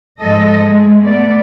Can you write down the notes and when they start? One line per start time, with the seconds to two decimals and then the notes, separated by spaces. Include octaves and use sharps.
0.19 G#2 F3 G#3 A4 D#5
0.60 G#3 A3
1.04 A3 B3 D5